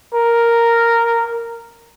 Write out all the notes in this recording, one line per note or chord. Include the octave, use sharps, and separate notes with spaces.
A#4